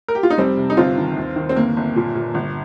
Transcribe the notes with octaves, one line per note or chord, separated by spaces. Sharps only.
A#4
G4
F4
D#4
F1 G3 C4
C3
D#4
G1 C4 F4
D#3
D#2
D#3
C4
G1 A#3
G1
A#2
A#2
G1